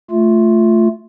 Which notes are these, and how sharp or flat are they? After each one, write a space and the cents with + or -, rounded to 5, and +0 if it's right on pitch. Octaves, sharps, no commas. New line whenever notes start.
A3 +0 F4 +0